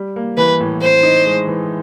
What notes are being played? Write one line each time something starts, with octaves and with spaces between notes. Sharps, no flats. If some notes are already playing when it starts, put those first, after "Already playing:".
Already playing: G3
A#3
E3 B4
A2
C4 C5
D#4
G#3
E3